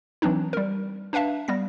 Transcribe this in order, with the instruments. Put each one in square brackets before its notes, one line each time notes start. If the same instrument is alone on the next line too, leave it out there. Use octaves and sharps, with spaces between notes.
[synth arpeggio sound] E3 F#3 C4 D4 D#4
G3 A#4
D4 B4 E5 F5 A5
G3 B3 A#6